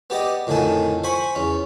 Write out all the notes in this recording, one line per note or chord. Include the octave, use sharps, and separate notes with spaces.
B3 G4 D5 D#5
F2 A2 D3 D#3 G#5 A5
C5 G#5 B5 C#6
E2 C#4